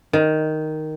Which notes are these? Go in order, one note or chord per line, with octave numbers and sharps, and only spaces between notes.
D#3